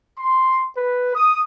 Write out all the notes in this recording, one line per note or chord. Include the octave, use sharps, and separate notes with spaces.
C6
B4
D#6